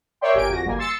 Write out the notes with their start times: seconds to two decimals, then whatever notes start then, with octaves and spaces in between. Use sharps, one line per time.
0.21 A#4 C#5 D5 E5 G5 C6
0.34 G1 G4 A#4 G#5 D7
0.49 F2 F#4 A#6
0.64 G1 G3 A#3 G#5
0.78 C6 E6 A6 C#7